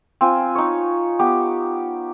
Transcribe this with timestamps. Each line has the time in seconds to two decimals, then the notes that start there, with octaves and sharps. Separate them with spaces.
0.21 C4 F4 G#5
0.55 D#4 C#5
1.19 B3 G4